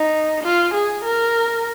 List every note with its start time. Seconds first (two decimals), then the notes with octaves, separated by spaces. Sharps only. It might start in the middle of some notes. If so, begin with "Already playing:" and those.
Already playing: D#4
0.44 F4
0.74 G#4
1.05 A#4